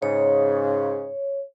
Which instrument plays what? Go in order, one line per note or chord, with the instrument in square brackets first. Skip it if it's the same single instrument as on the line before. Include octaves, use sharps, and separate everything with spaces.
[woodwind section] G#2 C#3 [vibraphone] C#5